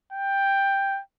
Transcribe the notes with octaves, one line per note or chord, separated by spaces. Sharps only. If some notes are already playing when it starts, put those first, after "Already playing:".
G5